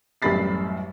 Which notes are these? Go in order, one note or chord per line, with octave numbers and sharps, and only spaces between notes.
A1 F#2 G3 B5 A6 C7